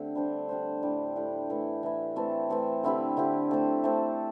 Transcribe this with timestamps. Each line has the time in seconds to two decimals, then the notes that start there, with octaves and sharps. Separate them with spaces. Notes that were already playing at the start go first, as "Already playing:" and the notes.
Already playing: D3 A3 C4 G4
0.15 G3 D4 C5
0.49 G3 D4 C5
0.82 A2 G3 D4 G4
1.16 A2 G3 D4 G4
1.49 E3 A3 E4
1.83 E3 A3 E4
2.16 E3 A3 C4 A4
2.50 E3 A3 C4 A4
2.83 D3 C4 E4 G4
3.17 D3 C4 E4 G4
3.51 A3 C4 A4 C5
3.84 A3 C4 A4 C5